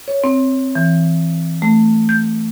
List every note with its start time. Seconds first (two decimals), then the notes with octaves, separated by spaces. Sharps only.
0.08 C#5
0.24 C4
0.75 E3
1.62 A3
2.09 G6